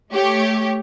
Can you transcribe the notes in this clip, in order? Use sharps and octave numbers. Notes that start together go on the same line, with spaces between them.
A3 G4 C#5